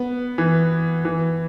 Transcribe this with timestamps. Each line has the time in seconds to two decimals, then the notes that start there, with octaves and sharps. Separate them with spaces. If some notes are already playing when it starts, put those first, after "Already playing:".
Already playing: B3
0.38 E3
1.05 E3